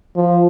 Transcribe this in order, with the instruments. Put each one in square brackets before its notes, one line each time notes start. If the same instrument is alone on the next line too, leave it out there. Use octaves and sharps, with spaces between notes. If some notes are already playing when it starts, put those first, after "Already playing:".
[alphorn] F3